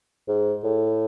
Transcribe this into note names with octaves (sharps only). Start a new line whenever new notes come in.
G#2
A2